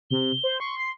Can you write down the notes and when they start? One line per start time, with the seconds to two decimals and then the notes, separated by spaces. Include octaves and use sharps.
0.10 C3 G7
0.43 C5
0.60 C6 C#6
0.79 C7